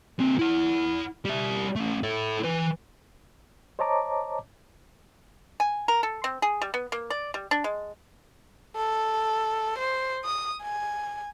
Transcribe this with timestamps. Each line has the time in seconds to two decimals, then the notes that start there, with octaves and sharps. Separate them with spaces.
0.19 D3 C4
0.39 E4 F#5
1.25 G3 E5
1.76 A3 C#4
2.03 E4 A4
2.44 E3 B4
3.79 C5 C#5 D#5 A5 A#5 D6
5.60 G#5
5.88 A#4
6.03 A4
6.24 C4
6.42 G#4
6.61 G3
6.74 B3
6.92 A#3
7.10 D5
7.34 G3
7.51 D4
7.64 G#3
8.76 A4
9.79 C5
10.25 D#6
10.63 G#5